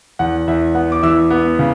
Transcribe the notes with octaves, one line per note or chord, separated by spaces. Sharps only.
E2 F#5
E2 E5
B3 F#5
D6
E3 E5 E6
B3
C#3